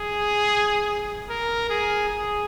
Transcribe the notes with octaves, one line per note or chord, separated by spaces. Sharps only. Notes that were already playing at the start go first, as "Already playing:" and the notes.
Already playing: G#4
A#4
G#4
G#4